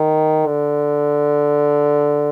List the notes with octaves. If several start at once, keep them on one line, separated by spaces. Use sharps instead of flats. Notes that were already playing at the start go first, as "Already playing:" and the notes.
Already playing: D#3
D3